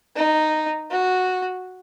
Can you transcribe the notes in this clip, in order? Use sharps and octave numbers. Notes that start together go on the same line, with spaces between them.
D#4
F#4